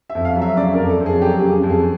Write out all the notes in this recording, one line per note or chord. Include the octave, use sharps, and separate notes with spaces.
E5
F2
F5
F#3
E5
C#3 D5
F2 A#4
A4
F2
G#4
F#3 G4
C#3 G#4
F2
G#4